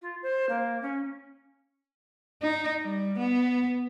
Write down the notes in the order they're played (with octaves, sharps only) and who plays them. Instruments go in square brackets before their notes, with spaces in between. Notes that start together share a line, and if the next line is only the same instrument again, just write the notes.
[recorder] F4
C5
A#3
C#4
[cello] D#4
G3
B3